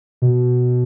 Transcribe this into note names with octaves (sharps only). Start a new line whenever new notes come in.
B2